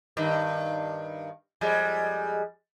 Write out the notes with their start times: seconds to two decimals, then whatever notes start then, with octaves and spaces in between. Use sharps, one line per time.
0.17 G2 D#3
1.61 F2 G3 G#3